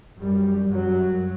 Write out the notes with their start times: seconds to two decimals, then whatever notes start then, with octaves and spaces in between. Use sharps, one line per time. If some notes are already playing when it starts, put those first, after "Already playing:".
0.19 F#2 G3
0.69 F#2 F#3